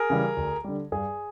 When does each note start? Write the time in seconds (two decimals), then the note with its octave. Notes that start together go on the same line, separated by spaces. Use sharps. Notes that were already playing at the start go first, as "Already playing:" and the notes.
Already playing: G#4 A#4
0.10 C#3 E3 G3
0.37 D2
0.64 D3 G3
0.92 G2 G#4